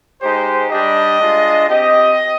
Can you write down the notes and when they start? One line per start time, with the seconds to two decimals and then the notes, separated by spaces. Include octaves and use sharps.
0.21 G#3 D#4 G4 C5
0.70 G3 D4 G4 D#5
1.18 G#3 D4 F4
1.68 C4 G4 D#5